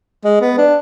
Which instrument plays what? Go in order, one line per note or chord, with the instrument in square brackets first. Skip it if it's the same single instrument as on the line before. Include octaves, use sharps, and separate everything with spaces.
[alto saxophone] G#3
B3
D4